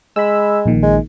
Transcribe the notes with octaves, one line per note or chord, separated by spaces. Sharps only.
G#3 B5 E6
A#1 A#2 D#3
G#3